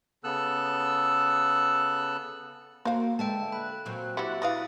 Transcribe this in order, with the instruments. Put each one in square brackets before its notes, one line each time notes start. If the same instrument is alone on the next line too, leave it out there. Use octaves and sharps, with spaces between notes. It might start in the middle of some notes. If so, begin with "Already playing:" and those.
[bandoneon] C#3 B3 A4 E6 F#6
[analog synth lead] A#3 [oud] F#4 A#4 [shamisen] C5 F5
[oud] D3 B4 E5 [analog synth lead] G#3 [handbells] G5 A5
[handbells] B5 [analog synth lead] F#6
[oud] A#2 F#3 C4
[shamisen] E3 E4 [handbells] G4 E5 F#5
[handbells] E4 D#6 A6 [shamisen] F#4 B4 F5